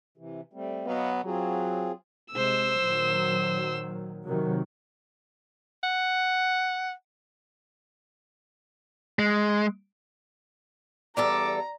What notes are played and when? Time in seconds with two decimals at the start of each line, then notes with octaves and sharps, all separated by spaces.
0.17 C3 E3
0.53 G3 A3 C4
0.86 B2 F#3 B3 D#5 F5 F#5
1.25 F#3 C4 F4 G#4
2.32 C3 G#3 C5 E6
2.82 A#2 D#3 F#3
4.24 C3 D#3 F#3
5.83 F#5
9.19 G#3
11.17 E2 G3 A4 D5 A#5 D6